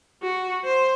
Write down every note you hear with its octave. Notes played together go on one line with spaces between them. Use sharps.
F#4
C5